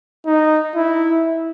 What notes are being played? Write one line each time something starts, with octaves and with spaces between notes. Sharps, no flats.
D#4
E4